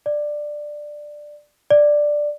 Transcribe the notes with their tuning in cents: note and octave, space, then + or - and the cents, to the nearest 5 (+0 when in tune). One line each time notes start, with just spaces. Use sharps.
D5 +10
D5 +5